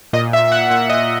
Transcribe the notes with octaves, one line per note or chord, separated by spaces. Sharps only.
A#2 D#5
A#2 E5
A#2 F#5
A#2 F#5
A#2 D#5